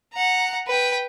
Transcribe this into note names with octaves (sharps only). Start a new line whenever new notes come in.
F#5 A#5
B4 G5